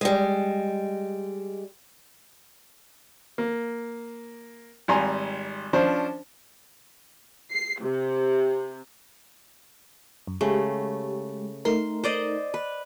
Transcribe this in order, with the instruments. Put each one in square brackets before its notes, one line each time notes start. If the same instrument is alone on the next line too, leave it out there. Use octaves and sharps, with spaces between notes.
[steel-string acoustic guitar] G3 G#3
[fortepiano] A#3
G#1 G3 G#5 A#5 C6
F3 C#4 D4 C5
[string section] C7
C3
[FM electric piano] F#2
[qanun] C#3 A3 [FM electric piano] G#3 G4
[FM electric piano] A3 D#4 A#4 [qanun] C6
[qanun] C5 D5 D#5
B4